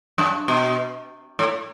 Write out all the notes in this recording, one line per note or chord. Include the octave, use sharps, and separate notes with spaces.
F#2
B2
A2